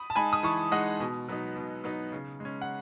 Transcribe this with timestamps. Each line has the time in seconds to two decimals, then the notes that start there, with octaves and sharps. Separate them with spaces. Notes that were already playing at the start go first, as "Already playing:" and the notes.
Already playing: B5 D#6
0.10 A5
0.16 G#3 D#4 G#5 B5
0.33 D#6
0.43 E3 A5 C#6
0.72 G#3 D#4 D#5 F#5
1.00 B2
1.28 F#3 B3 D#4
1.56 B2
1.84 F#3 B3 D#4
2.12 C#3
2.40 G#3 C#4
2.62 F#5